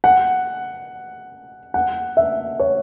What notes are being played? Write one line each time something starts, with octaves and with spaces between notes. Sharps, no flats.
F#5
F#5
E5
C#5